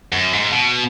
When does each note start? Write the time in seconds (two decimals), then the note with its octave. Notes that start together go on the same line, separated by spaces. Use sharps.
0.13 F#2
0.33 G#2
0.52 B2